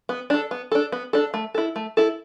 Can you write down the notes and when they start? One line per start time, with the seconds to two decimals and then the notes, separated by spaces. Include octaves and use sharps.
0.09 B3
0.30 D4 A4
0.51 B3
0.72 D4 A4
0.92 B3
1.13 D4 A4
1.34 A3
1.54 E4 A4
1.76 A3
1.97 E4 A4